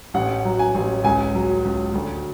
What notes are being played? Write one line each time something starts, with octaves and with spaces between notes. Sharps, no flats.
A1 F#5
F#3
G#5
A1
C#2 G#5
F#3
C#2
D2